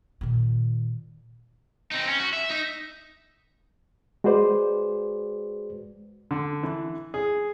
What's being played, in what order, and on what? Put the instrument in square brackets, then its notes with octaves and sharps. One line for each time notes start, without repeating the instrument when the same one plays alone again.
[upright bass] A#2 D#3
[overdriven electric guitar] C4 D#4
C#4
F#4
E5
D#4
[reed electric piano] G#3 F#4 G#4 B4 C5 D5
[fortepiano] D3
E3
G#4